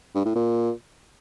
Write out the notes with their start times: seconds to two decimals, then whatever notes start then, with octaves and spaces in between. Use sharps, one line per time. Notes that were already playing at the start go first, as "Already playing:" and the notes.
0.15 G2
0.25 A2
0.35 A#2